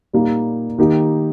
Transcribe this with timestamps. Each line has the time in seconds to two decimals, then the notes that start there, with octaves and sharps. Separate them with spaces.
0.13 A#2 G3 A#3 D#4
0.78 D#3 A#3 D#4 G4